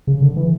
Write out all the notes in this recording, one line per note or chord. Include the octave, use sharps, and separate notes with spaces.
C#3
D3
E3